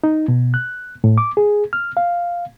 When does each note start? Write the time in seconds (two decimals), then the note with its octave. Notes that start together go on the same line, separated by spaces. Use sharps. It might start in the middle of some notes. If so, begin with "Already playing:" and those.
0.04 D#4
0.28 B2
0.54 F#6
1.04 A2
1.18 D6
1.37 G#4
1.73 F6
1.97 F5